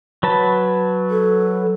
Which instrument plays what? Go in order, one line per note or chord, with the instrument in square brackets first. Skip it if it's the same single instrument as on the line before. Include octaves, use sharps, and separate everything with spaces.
[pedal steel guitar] F#3 B4 A5
[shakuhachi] A4